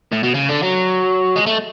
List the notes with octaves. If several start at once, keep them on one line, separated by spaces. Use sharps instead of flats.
A2
B2
C#3
D3
F#3
G#3
A3